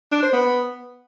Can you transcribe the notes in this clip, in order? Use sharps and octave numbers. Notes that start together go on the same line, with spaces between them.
D4
C5
B3